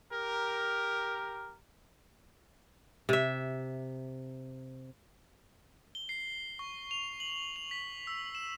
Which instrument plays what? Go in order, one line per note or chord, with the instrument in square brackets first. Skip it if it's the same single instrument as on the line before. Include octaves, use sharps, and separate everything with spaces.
[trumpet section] G4 A#4
[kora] C3 E5
[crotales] G7
C7
C#6
F7
F#7
F7
B6
E6
E7